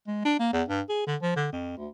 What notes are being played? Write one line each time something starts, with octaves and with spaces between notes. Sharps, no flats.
G#3
D4
A#3
E2
G2
G#4
D3
F3
D3
F2
D2